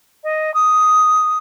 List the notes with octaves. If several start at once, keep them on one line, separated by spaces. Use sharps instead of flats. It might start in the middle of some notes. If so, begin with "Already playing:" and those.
D#5
D#6